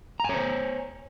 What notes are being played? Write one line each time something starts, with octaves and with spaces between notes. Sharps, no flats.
C5 C#5 G#5 A#5